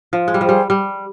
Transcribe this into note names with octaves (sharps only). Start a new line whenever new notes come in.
F3
G#3
G3
F3 G#4 C5 G5
G3
G3